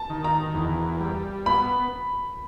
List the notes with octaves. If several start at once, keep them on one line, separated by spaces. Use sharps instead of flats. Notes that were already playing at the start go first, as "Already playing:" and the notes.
Already playing: A5
D#3
A#5
E2
G3
B3 B5